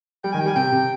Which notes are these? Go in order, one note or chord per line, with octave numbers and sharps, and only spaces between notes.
G3 G5
D#3 G#5
G5
G3 G#5
C3 G5
C3